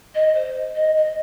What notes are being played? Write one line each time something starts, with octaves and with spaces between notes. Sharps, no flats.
D#5
C5
D#5
D#5